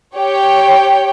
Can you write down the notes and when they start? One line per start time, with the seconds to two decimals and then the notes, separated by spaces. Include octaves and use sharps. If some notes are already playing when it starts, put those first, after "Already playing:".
0.16 G4 C#5 G5